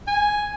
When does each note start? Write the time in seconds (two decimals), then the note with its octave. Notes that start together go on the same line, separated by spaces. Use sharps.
0.07 G#5